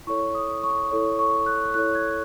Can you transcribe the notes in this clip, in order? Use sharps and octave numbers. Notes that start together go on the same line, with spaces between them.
E4 A4 C#5 C#6
D#6
C#6
E4 A4 C#5
C#6
F#6
E4 A4 C#5 F#6
G#6